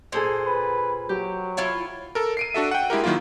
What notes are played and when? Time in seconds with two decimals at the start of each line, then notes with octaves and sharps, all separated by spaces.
0.12 A#2 G#4 A4 C5
0.46 B4
1.09 F#3 G4
1.57 E4 F4 C#5
2.15 A4 A#4
2.37 C7 D7 D#7
2.54 D4 F#4 A4 E5
2.71 F#5 G5
2.90 G#3 E4 G4 A#4
3.04 D#3 F#3 A#3 E4 F4